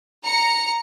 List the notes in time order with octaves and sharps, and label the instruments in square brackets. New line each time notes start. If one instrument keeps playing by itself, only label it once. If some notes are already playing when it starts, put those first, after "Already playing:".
[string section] A#5 C#7